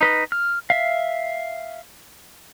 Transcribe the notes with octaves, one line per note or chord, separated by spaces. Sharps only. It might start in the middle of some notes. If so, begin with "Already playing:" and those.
D#4 B4 D#5
F6
E5 F5